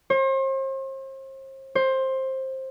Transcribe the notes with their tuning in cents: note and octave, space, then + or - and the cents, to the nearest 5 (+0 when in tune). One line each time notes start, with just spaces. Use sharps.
C5 +40
C5 +15